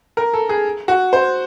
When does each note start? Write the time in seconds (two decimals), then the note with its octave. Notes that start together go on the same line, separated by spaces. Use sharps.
0.17 A#4
0.34 A4
0.49 G#4
0.88 F#4
1.13 C5